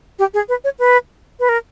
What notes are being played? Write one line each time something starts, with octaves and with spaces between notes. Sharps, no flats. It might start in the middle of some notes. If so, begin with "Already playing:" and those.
G4
G#4
B4
C#5
B4
B4
A#4